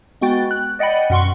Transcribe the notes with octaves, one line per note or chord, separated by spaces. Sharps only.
G#3 B3 F#4 G5 A6
F#6
D5 D#5 F#5 G5 B5
F#2 B2 F#5 C6 C#6